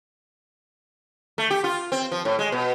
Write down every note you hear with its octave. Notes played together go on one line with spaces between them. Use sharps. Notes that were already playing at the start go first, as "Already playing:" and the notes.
A3
G4
F4
C4
F3
A2
G#3
B2